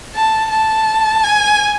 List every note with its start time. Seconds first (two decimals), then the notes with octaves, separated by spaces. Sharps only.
0.14 A5
0.51 A5
1.23 G#5